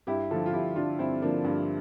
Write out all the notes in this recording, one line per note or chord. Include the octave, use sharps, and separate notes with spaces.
G2 E4 G4
D3 F3 F4 A4
F4
G2 E4 G4
D3 F3 D4 F4
G2 C4 E4
D3 F3 A#3 D4
G2